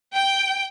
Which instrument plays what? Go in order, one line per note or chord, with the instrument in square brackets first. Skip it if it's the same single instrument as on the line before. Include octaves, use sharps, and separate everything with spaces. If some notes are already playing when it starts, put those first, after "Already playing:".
[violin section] G5